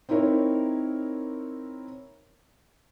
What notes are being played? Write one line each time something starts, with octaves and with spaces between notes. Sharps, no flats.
C4 D#4 E4 A#4 C#5